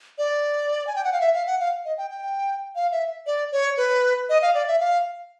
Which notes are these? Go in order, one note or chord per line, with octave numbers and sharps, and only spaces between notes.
D5
G#5
G5
F#5
F5
E5
F5
F#5
F5
D#5
G5
G5
F5
E5
D5
C#5
B4
D#5
F5
D5
E5
F5